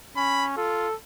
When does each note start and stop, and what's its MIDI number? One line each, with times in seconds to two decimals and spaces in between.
0.16 0.57 61
0.16 0.45 83
0.57 0.87 65
0.57 0.94 69